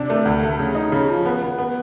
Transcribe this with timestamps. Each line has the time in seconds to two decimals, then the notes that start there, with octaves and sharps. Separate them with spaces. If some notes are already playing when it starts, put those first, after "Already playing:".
Already playing: C3 D4
0.10 A3
0.25 D2
0.43 A3
0.59 C#3
0.75 D#4
0.92 C#3
1.09 F3
1.25 B3
1.42 B3
1.58 B3